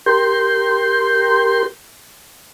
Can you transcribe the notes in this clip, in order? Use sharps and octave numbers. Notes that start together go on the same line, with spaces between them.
G4 A#4 C6 G6